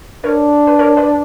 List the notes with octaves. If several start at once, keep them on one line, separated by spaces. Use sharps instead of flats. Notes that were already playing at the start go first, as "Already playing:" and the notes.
D4 A#4 C#5
B4
A#4 C#5
B4 D5